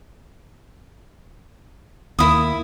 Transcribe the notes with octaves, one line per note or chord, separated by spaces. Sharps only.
D#2 A#3 E4 D#6